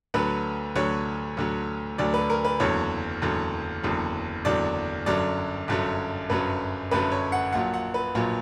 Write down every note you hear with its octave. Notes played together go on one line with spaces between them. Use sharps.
D2 D3 F#3 B4
D2 D3 F#3 C#5
D2 D3 F#3
D2 D3 F#3 D5
B4
A#4
B4
F#1 E2 D3 F#3 C#5
F#1 E2 D3 F#3
F#1 E2 D3 F#3
F#1 E2 D3 F#3 D5
G1 F#2 D3 F#3 D5
G1 F#2 D3 F#3
G1 F#2 D3 F#3 B4
G1 F#2 D3 F#3 B4
C#5
F#5
A#1 A#2 F#3 F#5
F#5
B4
A#1 A#2 F#3